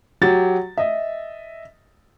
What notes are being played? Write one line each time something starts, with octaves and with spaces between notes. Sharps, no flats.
F#3 G4 A6
D#5 E5